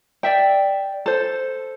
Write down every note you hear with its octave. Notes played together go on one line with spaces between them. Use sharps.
D5 E5 G5
A4 C5